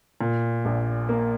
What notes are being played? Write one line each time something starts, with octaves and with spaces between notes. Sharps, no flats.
A#2
A#1
A#3